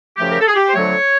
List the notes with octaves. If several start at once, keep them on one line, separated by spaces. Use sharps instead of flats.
F#2 C#3 F3 A3 G4
A#4
A4
G#4
G4
C5
F2 D3 F#3 A3 C#5